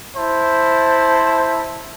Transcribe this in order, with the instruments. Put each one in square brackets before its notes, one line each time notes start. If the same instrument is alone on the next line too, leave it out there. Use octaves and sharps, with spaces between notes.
[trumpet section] E4 C5 A5